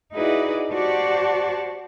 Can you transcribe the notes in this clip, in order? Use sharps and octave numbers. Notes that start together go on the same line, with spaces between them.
D#4 E4 F#4 G#4 B4 D5
F#4 G4 C5 D5 A5 C#6